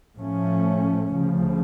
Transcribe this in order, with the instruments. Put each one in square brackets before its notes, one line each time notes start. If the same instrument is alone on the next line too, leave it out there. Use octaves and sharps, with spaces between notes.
[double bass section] A2 F3 A3 C#4
D2 C#3 F3